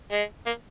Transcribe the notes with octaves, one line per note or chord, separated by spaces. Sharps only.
G#3
A#3